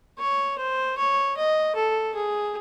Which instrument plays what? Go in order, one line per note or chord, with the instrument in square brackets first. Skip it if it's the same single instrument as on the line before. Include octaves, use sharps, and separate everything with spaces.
[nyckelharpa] C#5
C5
C#5
D#5
A4
G#4